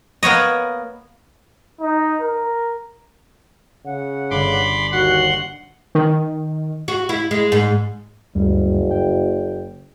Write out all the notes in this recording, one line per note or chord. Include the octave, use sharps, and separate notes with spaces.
A#3 B3 C#5 D#5
D#4
A#4
C#3 F#5
G1 B5 C6 D6
D#2 F#4 F#5 C6
D#3
F#4
E4
G#3
G#2
F#1 D2 G2 G3
G5